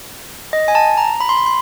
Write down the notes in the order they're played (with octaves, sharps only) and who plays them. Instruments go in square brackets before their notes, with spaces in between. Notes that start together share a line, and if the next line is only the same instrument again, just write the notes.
[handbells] D#5
G#5
A5
A#5
B5
C6
B5
C6